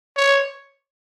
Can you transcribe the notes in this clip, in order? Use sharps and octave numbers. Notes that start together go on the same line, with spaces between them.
C#5